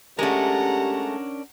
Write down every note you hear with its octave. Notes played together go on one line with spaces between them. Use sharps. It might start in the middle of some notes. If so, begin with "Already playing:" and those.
G#3 A3 C#4 D4 G4 A#4 F#5 A#5